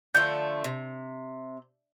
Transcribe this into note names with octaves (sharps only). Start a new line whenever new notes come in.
D3 F3 A3 G6
C3